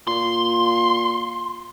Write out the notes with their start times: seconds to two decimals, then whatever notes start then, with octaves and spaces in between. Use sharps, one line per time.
0.07 A#2 C6